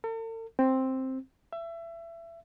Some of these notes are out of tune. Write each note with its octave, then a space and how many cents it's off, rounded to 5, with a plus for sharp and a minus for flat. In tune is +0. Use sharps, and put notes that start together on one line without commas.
A4 +45
C4 +5
E5 +25